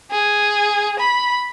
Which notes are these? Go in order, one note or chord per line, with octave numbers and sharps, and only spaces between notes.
G#4
B5